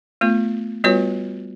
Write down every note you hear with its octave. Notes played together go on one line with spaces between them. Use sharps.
A3 B3 F4
G3 B3 F4 F#4 B4 C#5